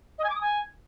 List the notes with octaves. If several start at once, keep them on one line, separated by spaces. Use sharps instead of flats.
D#5
G#5
D6
D#6
G#5